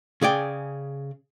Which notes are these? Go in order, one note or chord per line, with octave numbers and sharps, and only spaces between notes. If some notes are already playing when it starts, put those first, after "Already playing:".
C#3 G#4 D5 G5